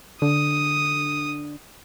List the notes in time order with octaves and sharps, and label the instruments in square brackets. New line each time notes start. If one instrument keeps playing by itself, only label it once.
[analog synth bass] D3 [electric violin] D#6